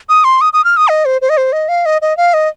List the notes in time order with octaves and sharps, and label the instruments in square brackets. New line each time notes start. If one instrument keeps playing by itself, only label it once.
[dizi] D#6
C6
D#6
D#6
F6
D#6
D#5
C5
C5
D#5
C5
D#5
F5
D#5
D#5
F5
D#5